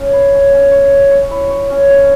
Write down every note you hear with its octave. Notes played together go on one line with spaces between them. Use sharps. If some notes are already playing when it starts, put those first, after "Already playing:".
Already playing: C#4
B4
C#4
C#4
C#5
E5
C#5
E4
C#5
C#4
C#4